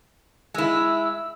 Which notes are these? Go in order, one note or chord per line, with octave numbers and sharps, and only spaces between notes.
G#3 E4 E6